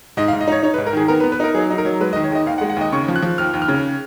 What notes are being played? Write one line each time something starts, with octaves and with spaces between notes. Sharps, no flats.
G#2 D#5
F5
G#2
D#5
D#4 C#5
D#4 C#5
B4
G#2
A#4
D#3 G#4
B3 A#4
B4
B3
B4
D#4 A#4
F#3 G#4
D#4
A#4
F#3
G#3 B4
D#5
D#3
C#5
D#2 D#5
D#2 F5
F#5
G#3
F#5
D#2 D#5
C#3 C#6
F3
F#6
F3
D#2 F6
D#2
F6
C#3